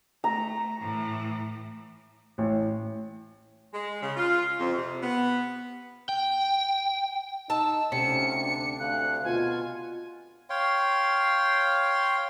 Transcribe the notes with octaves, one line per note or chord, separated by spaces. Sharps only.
A3 A#5
A2 E3
A1
G#3
C#3
F4
F2
C3
B3
G5
D#4 A5 E6
D2 C3 C#4 C#7
D4
D2 F5 F#6
B2 F4 G#5
C#5 F5 G5 C6